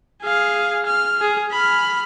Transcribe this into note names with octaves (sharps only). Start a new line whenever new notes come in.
G#4 F5
F6
G#4
B5 F6